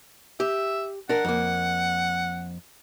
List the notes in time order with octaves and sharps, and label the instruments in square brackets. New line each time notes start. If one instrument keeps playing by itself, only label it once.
[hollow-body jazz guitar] G4 [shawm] E5
[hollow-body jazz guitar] D4 A#4 [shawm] F#5
[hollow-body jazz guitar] F2 A#3